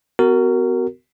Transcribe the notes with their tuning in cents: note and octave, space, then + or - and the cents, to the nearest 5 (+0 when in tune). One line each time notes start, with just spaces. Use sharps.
B3 +35 F#4 +20 A#4 -15